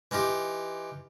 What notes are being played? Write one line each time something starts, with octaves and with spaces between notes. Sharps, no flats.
E3 D#4 F4 G4